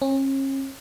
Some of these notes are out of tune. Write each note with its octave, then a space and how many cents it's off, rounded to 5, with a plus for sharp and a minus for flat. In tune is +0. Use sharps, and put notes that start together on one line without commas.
C#4 -40